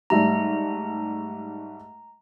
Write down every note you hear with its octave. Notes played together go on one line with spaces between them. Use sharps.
G#2 G3 A3 A#5